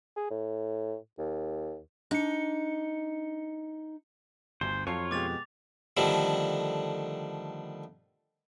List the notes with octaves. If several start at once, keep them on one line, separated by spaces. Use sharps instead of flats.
G#4
A2
D#2
D4 D#4 C#7
G1 D2 C5
F2 F#3 F4 C#5 A5 C7
B2 G#3 G4 D6 A6 F7
D3 D#3 F3 G3 A3